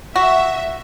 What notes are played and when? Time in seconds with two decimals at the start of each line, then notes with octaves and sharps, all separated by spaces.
0.16 F#4 E5